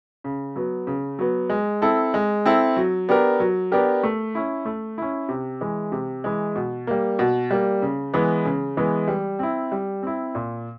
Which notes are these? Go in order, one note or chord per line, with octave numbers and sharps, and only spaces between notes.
C#3
F#3 B3
C#3
F#3 B3
G#3
C4 E4 A4
G#3
C4 E4 A4
F#3
B3 D4 G4 A#4
F#3
B3 D4 G4 A#4
A3
C#4 E4
A3
C#4 E4
C3
E3 G#3
C3
E3 G#3
B2
G3 A#3
B2
G3 A#3
C#3
E3 G#3 B3
C#3
E3 G#3 B3
G3
C4 E4
G3
C4 E4
A#2